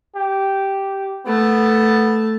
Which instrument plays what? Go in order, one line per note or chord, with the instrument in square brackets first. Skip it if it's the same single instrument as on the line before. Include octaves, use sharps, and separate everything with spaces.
[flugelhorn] G4
[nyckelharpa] A3 A5 [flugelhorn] B3